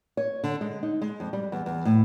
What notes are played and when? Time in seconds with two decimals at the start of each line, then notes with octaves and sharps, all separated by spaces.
0.17 C#5
0.44 D3
0.61 G#3
0.83 D#4
1.02 G#3
1.20 F2
1.33 G3
1.52 E2
1.66 E2
1.85 A2